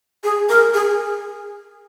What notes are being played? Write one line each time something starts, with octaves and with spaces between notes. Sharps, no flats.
G#4
A#4
G#4